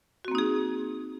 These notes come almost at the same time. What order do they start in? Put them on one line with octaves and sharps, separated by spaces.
F#4 C4 A#3 D#4 G#4